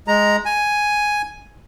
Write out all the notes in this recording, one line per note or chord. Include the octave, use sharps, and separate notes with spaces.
G#3 A#5
G#5